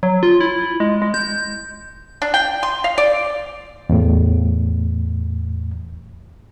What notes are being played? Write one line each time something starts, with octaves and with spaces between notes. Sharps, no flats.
F#3
F4
E4
G#3
G#3
G6
D4
G5
C6
F5
D5
E2 A2